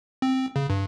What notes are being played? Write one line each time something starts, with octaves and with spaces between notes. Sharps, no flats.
C4
C#3
G2